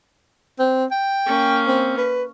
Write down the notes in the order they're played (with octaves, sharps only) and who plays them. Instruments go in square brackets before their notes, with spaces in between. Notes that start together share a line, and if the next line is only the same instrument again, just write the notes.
[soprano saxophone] C4
G5
[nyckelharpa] A#3 C#4
[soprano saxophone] C4
B4